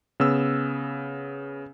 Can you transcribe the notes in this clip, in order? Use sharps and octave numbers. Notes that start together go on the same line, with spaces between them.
C#3 B3 E6